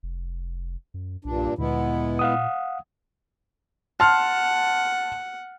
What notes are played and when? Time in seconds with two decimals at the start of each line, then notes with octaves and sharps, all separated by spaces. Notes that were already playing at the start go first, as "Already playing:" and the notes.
0.03 F1
0.94 F#2
1.25 B1 G2 A#2 D4
1.58 D2 A#2 G#3 B3 E4
2.19 F5 F#5 D#6
4.00 F#5 A5 C6 F6